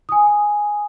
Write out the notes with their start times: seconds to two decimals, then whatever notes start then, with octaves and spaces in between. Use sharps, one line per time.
0.09 G#5 D#6